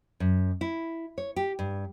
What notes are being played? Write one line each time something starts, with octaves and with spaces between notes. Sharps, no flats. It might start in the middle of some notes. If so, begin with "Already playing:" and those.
F#2
E4
C#5
G4
G2